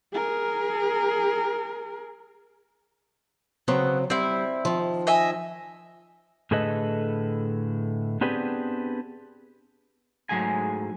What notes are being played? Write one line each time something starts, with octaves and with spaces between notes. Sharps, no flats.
G#4 A#4
C#3 F#3 B3 C4
G3 C4 E4
D#3 F3
D#5 E5 G#5
A2 D3 G#4 A4 B4 D#5
B3 C4 D4 G4 G#4 B4
G#2 F#3 A3 G#4 G#5